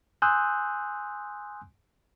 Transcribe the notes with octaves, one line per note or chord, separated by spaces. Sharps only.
G#5 C6 D#6 E6 F#6 G6